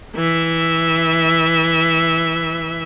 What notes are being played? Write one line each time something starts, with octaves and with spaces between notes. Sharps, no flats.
E3 E5